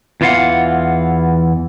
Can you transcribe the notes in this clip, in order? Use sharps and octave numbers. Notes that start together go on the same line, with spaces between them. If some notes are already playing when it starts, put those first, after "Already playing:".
E2 E3 F4 F5 F#5